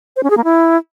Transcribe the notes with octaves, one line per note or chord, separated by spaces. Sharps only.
C5
C#4
G#4
A#3
E4